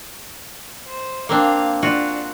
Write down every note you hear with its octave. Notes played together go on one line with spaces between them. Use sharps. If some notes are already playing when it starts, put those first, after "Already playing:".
C5
A#3 C4 D4 F5
D4 F4 F#4